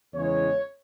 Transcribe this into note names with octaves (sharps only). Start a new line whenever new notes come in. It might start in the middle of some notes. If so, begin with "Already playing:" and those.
E2 C#3 E3 G#3 C#5